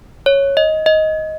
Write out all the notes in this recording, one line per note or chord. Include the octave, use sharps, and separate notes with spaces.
C#5
D#5
D#5